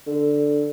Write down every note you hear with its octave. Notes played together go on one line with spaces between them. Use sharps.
D3